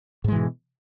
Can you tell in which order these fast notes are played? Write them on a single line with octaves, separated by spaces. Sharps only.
G#2 G#3 E3 B2